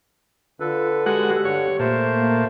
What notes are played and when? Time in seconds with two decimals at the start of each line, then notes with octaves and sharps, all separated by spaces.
0.60 D3 F4 A4 B4
1.06 G#3 F#4 G4 F#5
1.45 G2 D3 C#5 F#5
1.79 A#2 A3 C5 A5
2.16 A#3